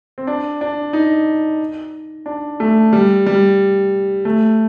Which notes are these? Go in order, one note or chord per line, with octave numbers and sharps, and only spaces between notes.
C4
D4
D4
D#4
D4
A3
G3
G3
A3